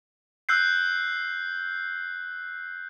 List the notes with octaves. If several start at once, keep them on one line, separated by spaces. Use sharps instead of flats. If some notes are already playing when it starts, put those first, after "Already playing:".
E6 F#6 G6 C7